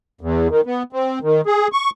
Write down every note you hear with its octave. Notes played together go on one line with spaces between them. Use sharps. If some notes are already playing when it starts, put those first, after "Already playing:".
E2
D#3
B3
C4
D#3
G#4
C#6